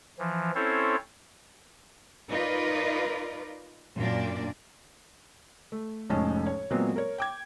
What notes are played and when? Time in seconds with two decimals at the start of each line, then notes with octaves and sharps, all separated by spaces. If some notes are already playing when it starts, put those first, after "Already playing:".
0.19 E3 F3
0.55 C4 C#4 E4 A4 C5 C#5
2.30 D#4 F4 A#4 B4 D5 D#5
3.95 F#2 A#2 A#3 D4 D5
5.72 A3
6.10 F1 A2 G#3 C#4 A5
6.46 C#5
6.70 A#2 F#3 G#3 B3 C4
6.96 A#4 C#5
7.18 G5 D6 G#6